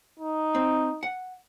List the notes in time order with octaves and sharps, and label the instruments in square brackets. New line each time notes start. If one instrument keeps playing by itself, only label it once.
[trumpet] D#4
[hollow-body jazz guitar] C4
F#5